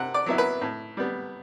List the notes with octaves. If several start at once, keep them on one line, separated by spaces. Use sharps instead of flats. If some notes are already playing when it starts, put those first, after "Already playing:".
Already playing: C3 F#5
D5
F#3 B3 E4
B4
A2
G3 B3